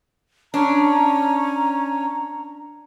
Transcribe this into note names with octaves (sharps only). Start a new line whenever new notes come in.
C#4 D4 A#5